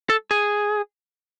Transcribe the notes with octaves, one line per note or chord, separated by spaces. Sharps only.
A4
G#4